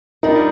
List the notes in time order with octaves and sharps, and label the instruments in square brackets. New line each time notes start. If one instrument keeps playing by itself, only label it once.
[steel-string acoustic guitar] G3 D4 F4 A#4 [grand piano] D#4